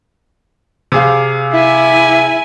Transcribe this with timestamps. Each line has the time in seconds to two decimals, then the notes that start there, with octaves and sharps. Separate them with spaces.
0.92 C3 G#4 F5
1.52 E4 E5 G#5